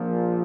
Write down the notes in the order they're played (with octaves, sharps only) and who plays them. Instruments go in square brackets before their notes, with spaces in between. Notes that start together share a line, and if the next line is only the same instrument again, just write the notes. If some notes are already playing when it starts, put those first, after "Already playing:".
Already playing: [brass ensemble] A#1 A#2 F3